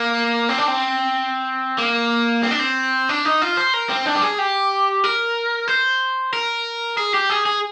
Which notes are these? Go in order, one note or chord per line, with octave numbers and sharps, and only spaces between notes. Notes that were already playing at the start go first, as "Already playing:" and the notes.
Already playing: A#3
C4
D4
C4
A#3
C4
D4
C4
D4
D#4
F4
C5
A#4
C4
D4
G4
G#4
G4
A#4
C5
A#4
G#4
G4
G#4
G#4